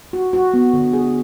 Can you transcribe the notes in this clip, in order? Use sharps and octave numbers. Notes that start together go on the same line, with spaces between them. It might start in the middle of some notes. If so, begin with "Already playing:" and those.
F#4
F#4
B3
D3
G#4